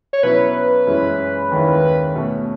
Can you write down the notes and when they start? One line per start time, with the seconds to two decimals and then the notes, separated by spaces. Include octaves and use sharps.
0.13 C#5
0.23 B2 F#3 C#4 E4 B4
0.87 F#2 E3 G#3 C#4 E4
1.51 D#2 D#3 G#3 C#4 E4
2.15 B2 A3 C#4